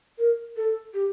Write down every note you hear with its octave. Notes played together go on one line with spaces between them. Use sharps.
A#4
A4
G4